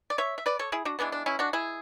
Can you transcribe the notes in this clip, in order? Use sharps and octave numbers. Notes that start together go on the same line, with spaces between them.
D5
C#5 E5
E5
B4 D5
A4 C#5
E4 G#4
D4 F#4
E3 G#3 B3 D4
D4
C#4 E4
D4 F#4
E4 G#4